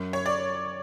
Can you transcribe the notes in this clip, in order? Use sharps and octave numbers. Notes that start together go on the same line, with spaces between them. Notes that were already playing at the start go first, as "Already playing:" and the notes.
Already playing: F#2
C#5
D5